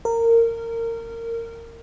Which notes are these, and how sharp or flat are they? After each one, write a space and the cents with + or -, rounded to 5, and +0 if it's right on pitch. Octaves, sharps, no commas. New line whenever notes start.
A#4 -20